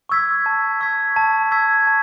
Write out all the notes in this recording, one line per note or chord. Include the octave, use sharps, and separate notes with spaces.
C#6 E6 G#6 B6
A5
C#6 E6 G#6 B6
A5
C#6 E6 G#6 B6
A5